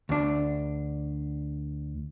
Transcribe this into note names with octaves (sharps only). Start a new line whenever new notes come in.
D2 D4